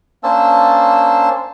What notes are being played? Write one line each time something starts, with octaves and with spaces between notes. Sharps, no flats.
A#3 C#4 D4 C5 A5 E6